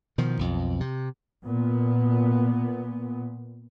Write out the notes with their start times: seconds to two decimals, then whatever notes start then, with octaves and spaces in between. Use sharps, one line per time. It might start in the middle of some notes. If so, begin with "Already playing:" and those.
0.18 B2 D#3 F3
0.39 B1 F2
0.80 C3
1.44 A#2 B3